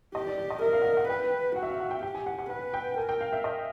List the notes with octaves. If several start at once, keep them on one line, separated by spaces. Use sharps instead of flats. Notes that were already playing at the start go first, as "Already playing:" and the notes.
G4 D#5
D5
D5
D#5
A#4 E5
F5
F#5
F5
F#5
B4 G5
F#4 F#5
E5
F5
F#5
G5
G4 G5
G#5
F#5
F#5
B4 F#5
G5
A#4 G#5
G5
F5
E5
D#5